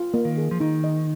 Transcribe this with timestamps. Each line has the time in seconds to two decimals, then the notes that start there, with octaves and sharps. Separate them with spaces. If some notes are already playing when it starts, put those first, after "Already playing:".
Already playing: F4
0.14 A#3
0.25 D#3
0.38 G#4
0.51 F3
0.60 D#3 D#4
0.84 D#5